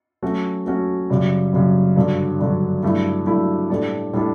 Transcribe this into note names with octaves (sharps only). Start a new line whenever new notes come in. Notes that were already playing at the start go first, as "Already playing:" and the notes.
F#3 A3 C#4 F#4
F#3 A3 C#4 F#4
F#2 C#3 G3
F#2 C#3 G3
G2 D3 F#3
G2 D3 F#3
G2 F#3 A3 E4
G2 F#3 A3 E4
A2 G3 D4 A4
A2 G3 D4 A4